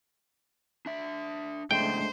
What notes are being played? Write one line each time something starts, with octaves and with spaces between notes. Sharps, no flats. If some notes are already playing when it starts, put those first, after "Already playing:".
D4 E5
F2 A2 C#3 G#3 A3 D4 C5 G5